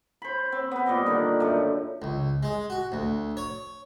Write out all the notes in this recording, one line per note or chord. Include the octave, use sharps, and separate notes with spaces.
C5 B5
C4
B3 B4
A#2 G3 D#5
D3 D#3
F#2 A3
C#2
G#3
F#4
D2
C#5